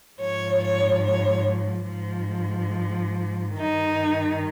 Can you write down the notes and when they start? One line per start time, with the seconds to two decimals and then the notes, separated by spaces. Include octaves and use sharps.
0.20 G#2 F3 C#5
0.62 C#5
1.04 C#5
1.89 G#2 F3
3.57 G2 D#3 D#4